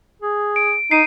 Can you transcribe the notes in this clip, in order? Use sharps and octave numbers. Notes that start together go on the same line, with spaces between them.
G#4
D7
D#4 C7 D#7